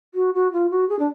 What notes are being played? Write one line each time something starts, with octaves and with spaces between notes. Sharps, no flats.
F#4
F#4
F4
F#4
G#4
D4